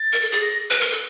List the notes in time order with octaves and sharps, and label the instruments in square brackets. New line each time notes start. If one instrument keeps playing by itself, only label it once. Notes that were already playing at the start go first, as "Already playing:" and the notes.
Already playing: [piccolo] A6
[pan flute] A#4
A4
G#4
[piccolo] A#6
[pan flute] B4
A#4
A4